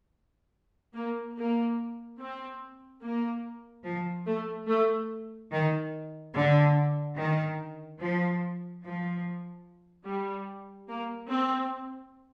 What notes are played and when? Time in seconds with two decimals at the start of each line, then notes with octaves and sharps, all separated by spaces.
0.95 A#3
1.37 A#3
2.19 C4
3.02 A#3
3.85 F3
4.26 A3
4.68 A3
5.51 D#3
6.33 D3
7.16 D#3
7.99 F3
8.82 F3
10.06 G3
10.88 A#3
11.29 C4